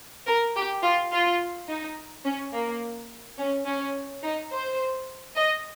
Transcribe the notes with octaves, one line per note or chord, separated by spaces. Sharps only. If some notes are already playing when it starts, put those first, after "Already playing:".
A#4
G4
F4
F4
D#4
C#4
A#3
C#4
C#4
D#4
C5
D#5